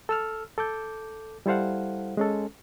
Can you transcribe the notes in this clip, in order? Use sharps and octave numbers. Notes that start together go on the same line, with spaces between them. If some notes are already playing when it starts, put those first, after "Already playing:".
A4 E6 F6
A4 D6 G6
G3 E4 A4 C5 F5 F#5
G#3 C#4 A4